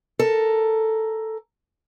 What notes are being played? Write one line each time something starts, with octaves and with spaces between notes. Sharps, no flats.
A4 A#4